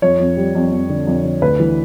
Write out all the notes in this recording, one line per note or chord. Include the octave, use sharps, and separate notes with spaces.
F2 C#5
F2
G3
F2
F2
D3
F2
D3
D2 B4
E3